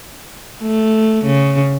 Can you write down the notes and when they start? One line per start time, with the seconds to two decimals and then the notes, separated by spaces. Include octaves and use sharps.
0.62 A3
1.25 C#3